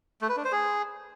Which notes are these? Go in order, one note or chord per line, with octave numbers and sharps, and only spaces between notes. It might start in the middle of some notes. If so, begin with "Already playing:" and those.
A3
B4
D4
C5
G#4